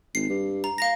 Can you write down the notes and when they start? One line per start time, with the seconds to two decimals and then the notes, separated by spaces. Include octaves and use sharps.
0.15 G#1 C7
0.30 G2
0.64 A#5
0.78 F5 A#5 A#6